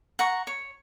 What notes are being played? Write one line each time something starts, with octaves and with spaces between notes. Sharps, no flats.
F#5 A#5 C#6
C#5